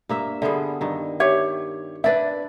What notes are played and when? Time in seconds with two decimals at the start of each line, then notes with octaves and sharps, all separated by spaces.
0.09 G2 A#3 E5
0.42 D3 G3 B3 G#4 E5
0.81 G2 D#3
1.20 G4 C#5 E5
2.04 D4 E4 B4 D5 E5